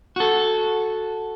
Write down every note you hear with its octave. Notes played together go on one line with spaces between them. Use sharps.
F#4 A4